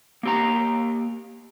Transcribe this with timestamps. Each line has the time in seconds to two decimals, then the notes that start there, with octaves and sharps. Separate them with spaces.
0.23 A#3 G4 A#5